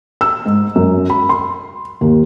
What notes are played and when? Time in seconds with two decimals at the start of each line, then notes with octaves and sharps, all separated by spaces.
0.21 E6
0.46 G#2
0.76 F#2
1.10 B5
1.29 C6
2.01 D#2